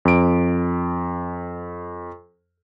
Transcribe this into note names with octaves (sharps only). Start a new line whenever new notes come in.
F2 D7